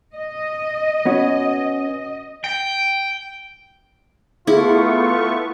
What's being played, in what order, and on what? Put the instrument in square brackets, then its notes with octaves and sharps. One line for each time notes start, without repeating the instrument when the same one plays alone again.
[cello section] D#5
[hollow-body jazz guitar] B3 C#4 F#4
[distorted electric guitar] G5
[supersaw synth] A3 B3 C#6 [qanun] E4 [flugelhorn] F4 [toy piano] G#4